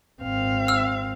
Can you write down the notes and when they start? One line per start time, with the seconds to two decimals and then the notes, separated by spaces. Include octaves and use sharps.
0.22 G#1 C4 F5
0.68 E6 F6